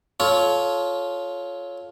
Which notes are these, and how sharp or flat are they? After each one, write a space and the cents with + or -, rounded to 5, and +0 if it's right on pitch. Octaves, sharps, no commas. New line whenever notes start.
F4 +5 A4 -25 C#5 +5